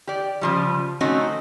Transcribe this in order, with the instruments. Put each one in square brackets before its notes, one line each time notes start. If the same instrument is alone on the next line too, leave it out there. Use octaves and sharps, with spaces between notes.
[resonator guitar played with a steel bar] G4 D5
C#3 F3 G3
A3 C4 C#4 D#4 F#4